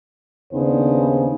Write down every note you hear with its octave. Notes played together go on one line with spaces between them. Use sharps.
D#2 C#3 B3 D4 D#4 C5